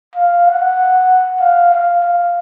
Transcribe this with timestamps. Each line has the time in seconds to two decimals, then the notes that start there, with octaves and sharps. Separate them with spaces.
0.16 F5
0.47 F#5
1.40 F5
1.72 F5
2.02 F5